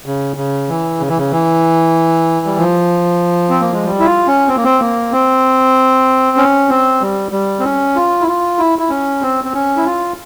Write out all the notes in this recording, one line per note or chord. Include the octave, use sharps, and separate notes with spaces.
C#3
C#3
E3
C#3
E3
C#3
E3
G3
F3
C4
A#3
G#3
G3
E4
F4
C#4
C4
A#3
C4
A#3
C4
C#4
C4
G3
G3
C4
C#4
F4
E4
F4
E4
E4
C#4
C4
C4
C#4
E4
F4